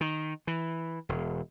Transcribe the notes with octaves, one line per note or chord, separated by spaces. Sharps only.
D#3
E3
E1